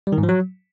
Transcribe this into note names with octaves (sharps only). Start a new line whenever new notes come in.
G3
D#3
G#2
F3
F#3